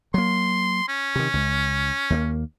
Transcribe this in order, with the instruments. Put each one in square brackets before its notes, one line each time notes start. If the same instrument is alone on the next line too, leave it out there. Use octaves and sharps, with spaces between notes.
[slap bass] F#3 A#3 [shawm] C6
[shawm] C#4
[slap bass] C3 D#3
C#2
D#2 G#3 A#3